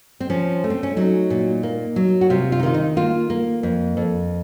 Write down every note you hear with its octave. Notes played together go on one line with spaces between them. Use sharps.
C4
F3 C#4
A3
C4
C#4
F#3 D#4
A#2
A#3
F#3
F#4
C3 F4
F4
D#4
D#3 F4
D#4
A#3 F4
A#3
F2
F2